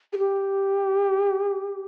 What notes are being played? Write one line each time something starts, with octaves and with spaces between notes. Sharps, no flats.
G#4
G4